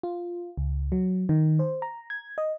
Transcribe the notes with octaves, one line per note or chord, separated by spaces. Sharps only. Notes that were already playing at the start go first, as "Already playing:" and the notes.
F4
C#2
F#3
D#3
C5
A#5
G#6
D#5